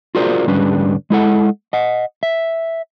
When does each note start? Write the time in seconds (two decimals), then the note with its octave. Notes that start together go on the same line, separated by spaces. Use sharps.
0.15 F4 F#4 G#4 A#4 C5 D5
0.46 D2 G#2 G3 C#4 D4 B4
1.10 G#3 E4 A4 F#5
1.73 D#5 F#5
2.23 E5